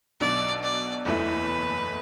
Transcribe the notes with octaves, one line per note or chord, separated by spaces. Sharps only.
B1 B2 F#3 D4 D5
D5
F#1 E2 E3 A3 E4 B4